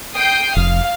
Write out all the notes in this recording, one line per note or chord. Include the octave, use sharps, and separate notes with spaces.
G5 D#6 C7
F1 F5